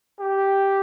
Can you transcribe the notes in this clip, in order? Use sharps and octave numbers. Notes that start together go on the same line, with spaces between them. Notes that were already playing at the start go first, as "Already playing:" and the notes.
G4